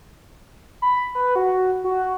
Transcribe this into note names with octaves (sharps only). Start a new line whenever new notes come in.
B5
B4
F#4
F#4